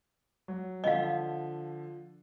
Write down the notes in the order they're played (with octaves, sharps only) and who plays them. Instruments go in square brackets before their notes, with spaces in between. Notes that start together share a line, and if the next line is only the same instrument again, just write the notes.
[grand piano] F#3
[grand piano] D3 F3 G7 [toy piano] D#5 F5